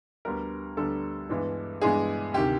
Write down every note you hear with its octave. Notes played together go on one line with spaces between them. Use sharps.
D2 D3 G3 B3 D4 A#4
D2 D3 G3 B3 D4 A4
G2 E3 G#3 B3 D4
G2 E3 G#3 B3 D4 G#4
D2 C3 D#3 G4